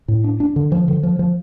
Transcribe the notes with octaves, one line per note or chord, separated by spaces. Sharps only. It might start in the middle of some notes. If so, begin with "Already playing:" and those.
A2
D4
D4
D3
F3
D3
F3
F3